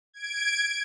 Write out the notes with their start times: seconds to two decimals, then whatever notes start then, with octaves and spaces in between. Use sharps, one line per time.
0.14 G#6 D7